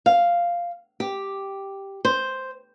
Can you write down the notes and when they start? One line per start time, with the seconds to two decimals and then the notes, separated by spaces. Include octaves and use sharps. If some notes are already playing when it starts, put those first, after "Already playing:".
0.06 F5
1.00 G4
2.05 C5